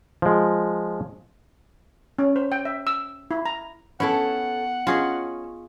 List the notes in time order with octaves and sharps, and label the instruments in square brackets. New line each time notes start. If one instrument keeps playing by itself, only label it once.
[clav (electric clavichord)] F3 G#3
[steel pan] C#4
C5
G5
E5
E6
E4
A#5
[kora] B3 E4 [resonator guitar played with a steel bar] C#4 A4 [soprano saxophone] F#5
[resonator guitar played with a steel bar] C#4 [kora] F4 G#4 D#5